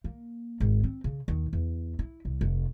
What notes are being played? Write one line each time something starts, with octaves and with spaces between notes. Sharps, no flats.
A#3
G#1
C4
C#3
D#2
E2
E4
C2
F1